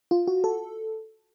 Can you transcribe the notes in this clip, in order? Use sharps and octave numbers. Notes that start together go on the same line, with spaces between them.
F4
F#4
A4